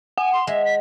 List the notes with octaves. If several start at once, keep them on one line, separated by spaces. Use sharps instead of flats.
F#5 G#5
C6
G#3 E5
B6